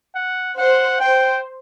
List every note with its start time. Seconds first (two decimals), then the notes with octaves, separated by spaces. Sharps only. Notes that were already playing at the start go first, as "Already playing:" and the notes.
0.15 F#5
0.58 C5 F#5
1.00 C5 G5